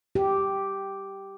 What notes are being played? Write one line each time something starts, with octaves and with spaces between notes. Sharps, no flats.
G4